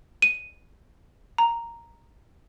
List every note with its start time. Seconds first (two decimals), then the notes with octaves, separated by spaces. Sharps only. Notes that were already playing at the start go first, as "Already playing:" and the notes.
0.22 D#7
1.38 A#5